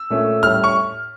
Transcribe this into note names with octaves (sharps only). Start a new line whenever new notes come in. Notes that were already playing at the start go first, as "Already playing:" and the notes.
Already playing: E6
A#2 A3 C#4
A2 G3 C#4 F6
C#6